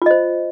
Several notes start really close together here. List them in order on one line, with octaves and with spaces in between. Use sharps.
F4 D#5 C5